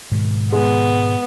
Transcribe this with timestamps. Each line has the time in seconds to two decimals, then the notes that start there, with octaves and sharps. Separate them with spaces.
0.11 G#2 B2 D#3
0.52 G#3 B3